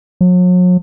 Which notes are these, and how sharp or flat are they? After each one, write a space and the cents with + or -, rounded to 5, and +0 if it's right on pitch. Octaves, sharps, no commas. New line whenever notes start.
F#3 -40